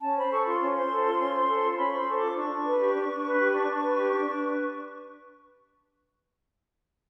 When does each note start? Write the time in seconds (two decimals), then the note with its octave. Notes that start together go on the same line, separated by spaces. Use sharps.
0.02 C#4 A5
0.17 C5 B5
0.31 A4 C#6
0.46 F4 C6
0.60 C#4
0.76 C5
0.91 A4
1.04 F4
1.19 C#4
1.34 C5
1.48 A4
1.63 F4
1.73 C6
1.77 C#4 B5
1.90 C#6
1.93 C5 C6
2.07 A4 C#6
2.17 F4 D6
2.36 D4 C#6
2.51 D4
2.65 B4
2.79 G4
2.94 D4
3.09 D4
3.24 B4
3.38 G4
3.52 D4
3.68 D4
3.81 B4
3.97 G4
4.11 D4
4.26 D4
4.40 B4